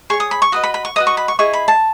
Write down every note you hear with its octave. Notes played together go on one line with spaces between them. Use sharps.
G#4 C#5 C#6
D#6
B5
C#6
F#4 B4 D#5 D#6
B5
B5
C#6
F#4 B4 D#5 D#6
C#6
B5
C#6
E4 G#4 D#5 C#6
B5
A5